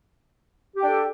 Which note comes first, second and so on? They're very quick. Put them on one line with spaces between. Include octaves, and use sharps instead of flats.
G4 G5 D4 A4